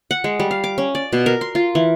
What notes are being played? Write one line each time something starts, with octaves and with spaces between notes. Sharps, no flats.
F#5
G#3
G3
F5
D6
C#4
D5
B2
A#4
C6
F4
E3